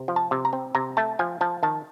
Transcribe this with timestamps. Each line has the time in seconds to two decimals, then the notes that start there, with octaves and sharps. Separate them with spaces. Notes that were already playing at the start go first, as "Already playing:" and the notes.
Already playing: C3
0.08 F3
0.16 A5
0.31 C3
0.45 A#5
0.53 C4
0.75 C3 A#5
0.97 A3 A5
1.19 F3 G#5
1.41 F3 A5
1.63 D#3 A5